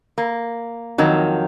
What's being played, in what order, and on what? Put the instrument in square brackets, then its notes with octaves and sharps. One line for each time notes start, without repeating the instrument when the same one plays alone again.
[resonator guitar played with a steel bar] A#3
F2 D#3 F#3